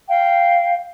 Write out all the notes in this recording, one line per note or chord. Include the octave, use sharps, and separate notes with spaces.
F5 G5